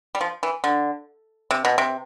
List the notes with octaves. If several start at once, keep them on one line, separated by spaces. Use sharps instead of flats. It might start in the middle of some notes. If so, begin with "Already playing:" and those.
G3
F3
E3
D3
C3
B2
C3